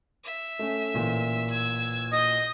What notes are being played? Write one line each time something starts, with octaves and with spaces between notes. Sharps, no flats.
E5
A3 C#4
A1 A#2
E6 G#6
D#5 D#6 G6